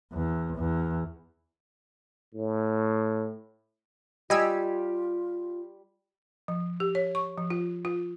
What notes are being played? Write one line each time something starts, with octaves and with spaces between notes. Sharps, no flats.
E2
E2
A2
G3 F4 G4 D#5 G#5 E6
F3
G4
C#5
C#6
F3
F4
F4